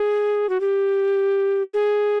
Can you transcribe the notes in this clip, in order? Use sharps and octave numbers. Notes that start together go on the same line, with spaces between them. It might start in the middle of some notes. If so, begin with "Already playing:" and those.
Already playing: G#4
F#4
G4
G#4